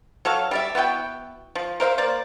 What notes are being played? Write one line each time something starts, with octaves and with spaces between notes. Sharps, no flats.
F#3 A4 C#5 F5
G3 D5 E5
B3 E4 F#4 G5
F3
A#4 C5 E5 F5
A#3 C5 D5